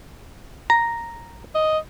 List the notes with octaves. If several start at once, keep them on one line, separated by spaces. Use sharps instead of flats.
A#5
D#5